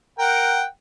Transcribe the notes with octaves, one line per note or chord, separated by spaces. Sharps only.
A#4 F#5 G5